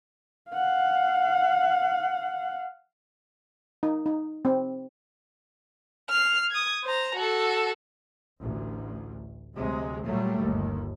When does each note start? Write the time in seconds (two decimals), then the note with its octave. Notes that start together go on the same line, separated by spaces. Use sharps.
0.51 F5 F#5
3.83 D#4
4.06 D#4
4.45 C4
6.09 F6 C7
6.51 D#6 G#6
6.84 C5 A#5
7.16 F#4 A4
8.39 A1 D2
9.55 D2 C3 F#3 G#3
10.02 A#2 F#3 G3 A3
10.40 G1 D#2